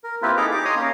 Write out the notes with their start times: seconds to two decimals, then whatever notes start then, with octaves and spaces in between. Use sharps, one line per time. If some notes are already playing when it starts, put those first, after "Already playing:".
0.04 A#4
0.22 A#3 C4 E4 F4 G4 B4
0.37 D#4 G#4 A4 A#5 D6
0.51 G4 D6
0.65 C#5 D#5 A#5 C6 D#6
0.76 A#3 C#4